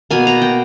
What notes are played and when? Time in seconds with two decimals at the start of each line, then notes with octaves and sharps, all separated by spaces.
0.11 B2 A#3 G#5
0.27 A#5
0.42 G5